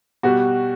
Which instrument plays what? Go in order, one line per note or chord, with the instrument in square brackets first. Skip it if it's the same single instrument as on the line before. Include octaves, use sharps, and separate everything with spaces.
[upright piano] B2 G3 F#4